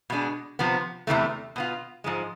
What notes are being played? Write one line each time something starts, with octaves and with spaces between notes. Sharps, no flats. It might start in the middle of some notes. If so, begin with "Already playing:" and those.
B2 G#3 D4
C3 F3 B3
E2 C3 E3 A3
B2 B3 F4
G#2 F3 G#3